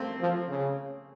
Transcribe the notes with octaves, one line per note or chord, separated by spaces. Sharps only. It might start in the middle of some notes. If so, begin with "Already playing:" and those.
Already playing: A3 A#3 C4
F3
C#3